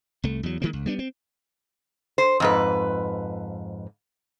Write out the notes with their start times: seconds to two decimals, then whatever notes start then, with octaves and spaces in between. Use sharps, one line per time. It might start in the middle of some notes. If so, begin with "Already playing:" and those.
0.24 C2 A3
0.43 E2 F#3
0.62 D#3 E3 G#3 A#3
0.73 C#2
0.86 G3 B3 D4
0.99 C4
2.18 C5
2.40 F2 G#2 B4